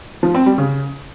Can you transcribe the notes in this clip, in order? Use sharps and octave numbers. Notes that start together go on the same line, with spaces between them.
F3
C4
G3
C#3